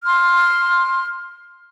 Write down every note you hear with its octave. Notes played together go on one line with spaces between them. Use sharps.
C6 F6